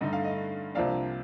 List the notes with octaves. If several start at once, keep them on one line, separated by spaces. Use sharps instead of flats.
G2 D3 A3 D#4 D#5
F5
D#5
C2 C3 F3 A#3 D4 D5 F5